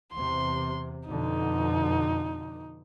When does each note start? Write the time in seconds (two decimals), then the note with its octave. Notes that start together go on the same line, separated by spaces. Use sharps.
0.14 E2 C3 C6
1.09 F2 B2 D3 D#4